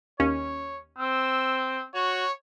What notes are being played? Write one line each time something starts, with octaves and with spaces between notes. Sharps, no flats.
D#2 C#4 C#5
C4 E6
F#4 C#5